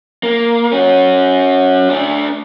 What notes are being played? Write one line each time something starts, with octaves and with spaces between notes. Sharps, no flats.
A#3
C#4 F#4
A3 D4